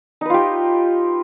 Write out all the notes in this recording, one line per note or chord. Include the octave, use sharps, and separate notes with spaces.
D#4 F4 G4 B4